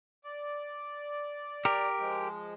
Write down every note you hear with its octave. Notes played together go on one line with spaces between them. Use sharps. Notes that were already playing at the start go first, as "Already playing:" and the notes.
D5
G4 A#4
F3 G#3